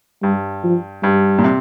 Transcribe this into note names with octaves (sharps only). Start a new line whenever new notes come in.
G2 G3
F3
G2 G3
A#2
C3